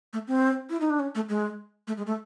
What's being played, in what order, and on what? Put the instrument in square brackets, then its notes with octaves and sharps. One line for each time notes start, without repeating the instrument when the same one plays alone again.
[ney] A3
C4
E4
D#4
D4
C#4
A3
G#3
A3
G#3
A3